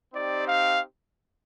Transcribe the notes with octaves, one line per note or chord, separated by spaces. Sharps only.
C4 D#4 G4 D5
F5